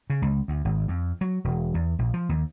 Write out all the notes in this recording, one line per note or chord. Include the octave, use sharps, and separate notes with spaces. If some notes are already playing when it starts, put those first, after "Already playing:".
C#3
C#2
D2
G#1
F2
F#3
E1
E2
A#1
F3
D#2